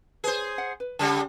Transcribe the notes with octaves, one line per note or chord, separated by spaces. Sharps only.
G#4 B4 C5
F#5
B4
C#3 G3 F#5 A5